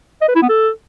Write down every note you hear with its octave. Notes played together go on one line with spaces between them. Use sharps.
D#5
B4
E4
B3
A4